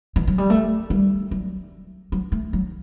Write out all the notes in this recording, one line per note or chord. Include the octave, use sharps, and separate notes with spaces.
E3
F#3
G3
A3
G3
F#3
F#3
A3
F#3